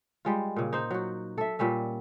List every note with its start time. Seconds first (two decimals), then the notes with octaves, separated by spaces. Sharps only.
0.25 G3 G#3 F4
0.56 A#2 C#3
0.73 D#4 C5
0.91 F#3 F#4
1.38 A4 E5
1.59 A#2 G3 C#4 E5